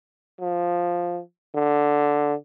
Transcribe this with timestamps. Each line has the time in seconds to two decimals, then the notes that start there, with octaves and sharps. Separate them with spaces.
0.41 F3
1.55 D3